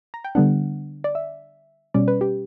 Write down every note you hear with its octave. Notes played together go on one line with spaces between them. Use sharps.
A#5
G5
D3 G3 B3 D4 F#5
D5
E5
B2 G3 C#4 D5
B4
G4